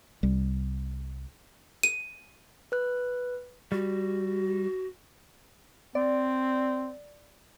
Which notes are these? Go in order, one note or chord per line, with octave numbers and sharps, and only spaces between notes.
C2 G3
D#7
B4 F#6
G3 F#4
C4 D5